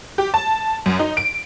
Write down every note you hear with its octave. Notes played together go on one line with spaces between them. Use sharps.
G4
A5
F#2
D#4
D7